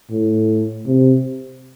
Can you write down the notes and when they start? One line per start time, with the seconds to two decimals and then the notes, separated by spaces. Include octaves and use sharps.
0.10 A2
0.86 C3